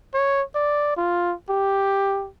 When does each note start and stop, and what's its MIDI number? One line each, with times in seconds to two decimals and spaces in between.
0.14 0.42 73
0.55 0.92 74
0.97 1.34 65
1.49 2.29 67